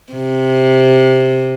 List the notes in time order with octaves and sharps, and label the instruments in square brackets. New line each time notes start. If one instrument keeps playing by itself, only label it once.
[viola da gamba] C3